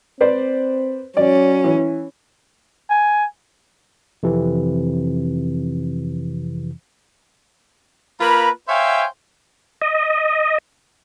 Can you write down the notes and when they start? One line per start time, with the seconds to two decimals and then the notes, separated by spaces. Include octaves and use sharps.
0.21 C4 B4 C5 D5
1.17 F#3 C#4 D5
1.64 E3
2.90 G#5
4.23 F2 C3 E3
8.20 A#3 F4 B4 A#5 B5
8.68 C5 C#5 E5 F5 G5 G#5
9.82 D#5